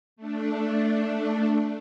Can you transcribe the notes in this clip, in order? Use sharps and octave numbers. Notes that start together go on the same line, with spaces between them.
A3 D4